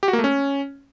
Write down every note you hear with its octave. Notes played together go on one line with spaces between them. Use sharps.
G4
F#4
A#3
A3
C#4